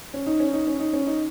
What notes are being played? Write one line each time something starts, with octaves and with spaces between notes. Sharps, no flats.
C#4
D#4
C#4
D#4
C#4
D#4
C#4
D#4